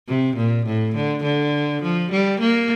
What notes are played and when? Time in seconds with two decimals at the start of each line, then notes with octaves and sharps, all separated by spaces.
0.08 C3
0.37 A#2
0.66 A2
0.96 D3
1.24 D3
1.83 F3
2.12 G3
2.40 A#3